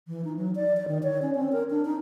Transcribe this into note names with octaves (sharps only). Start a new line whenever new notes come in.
E3
D#4
F#3
D5
D5
D#3
C#5
C#4
C4
A#4
D4
D#4